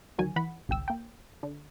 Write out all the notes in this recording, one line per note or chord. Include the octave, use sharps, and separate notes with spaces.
D2 D#3 F#3 F#4 G#5
E3 F#5 B5
G#1 C#2 G5 E6
A#3 G5
D3